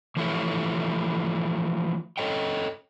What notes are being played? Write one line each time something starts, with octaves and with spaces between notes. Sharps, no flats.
E3 F3 A3 E4 G4 C#5
A4 C#5 D#5 G5